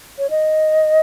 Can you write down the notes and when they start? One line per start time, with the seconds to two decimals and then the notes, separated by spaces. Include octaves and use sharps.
0.18 C#5
0.30 D#5